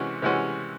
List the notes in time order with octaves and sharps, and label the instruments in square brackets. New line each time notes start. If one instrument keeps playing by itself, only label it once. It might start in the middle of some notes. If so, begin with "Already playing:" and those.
Already playing: [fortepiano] C3 E3 G#3 C#4 F#4
C3 E3 G#3 C#4 F#4